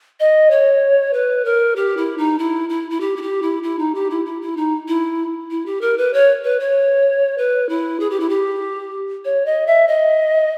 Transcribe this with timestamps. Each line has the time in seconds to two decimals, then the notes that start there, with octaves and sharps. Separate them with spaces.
0.20 D#5
0.51 C#5
1.13 B4
1.45 A#4
1.76 G4
1.97 E4
2.18 D#4
2.39 E4
2.69 E4
2.90 E4
3.01 G4
3.17 E4
3.22 G4
3.42 E4
3.63 E4
3.79 D#4
3.95 G4
4.10 E4
4.26 E4
4.42 E4
4.57 D#4
4.88 E4
5.51 E4
5.66 G4
5.81 A#4
5.98 B4
6.14 C#5
6.44 B4
6.60 C#5
7.38 B4
7.69 E4
8.00 G#4
8.10 G4
8.20 E4
8.30 G4
9.25 C#5
9.46 D#5
9.67 E5
9.88 D#5